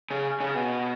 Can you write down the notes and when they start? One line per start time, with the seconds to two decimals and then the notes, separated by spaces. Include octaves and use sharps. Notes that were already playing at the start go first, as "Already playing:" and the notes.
0.11 C#3
0.40 C#3
0.55 B2